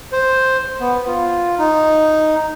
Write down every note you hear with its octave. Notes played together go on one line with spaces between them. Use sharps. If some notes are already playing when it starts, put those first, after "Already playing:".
C5
B3
F4
D#4